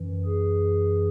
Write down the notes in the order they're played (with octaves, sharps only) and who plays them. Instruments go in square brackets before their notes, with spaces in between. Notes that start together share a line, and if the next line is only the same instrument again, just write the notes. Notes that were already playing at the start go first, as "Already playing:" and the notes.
Already playing: [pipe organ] F#2 E3
G#4